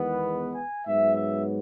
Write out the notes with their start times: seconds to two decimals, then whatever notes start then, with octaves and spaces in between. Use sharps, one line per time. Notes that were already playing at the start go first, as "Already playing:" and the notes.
Already playing: E2 D#3 G#3 B3
0.55 G#5
0.86 G#2 F#3 B3 E5
1.16 E5